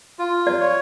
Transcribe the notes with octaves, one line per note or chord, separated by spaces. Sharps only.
F4
D5
C#5